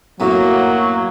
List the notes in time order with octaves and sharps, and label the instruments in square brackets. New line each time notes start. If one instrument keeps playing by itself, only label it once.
[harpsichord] F#2 A2 B3 [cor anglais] F#3 [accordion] A#3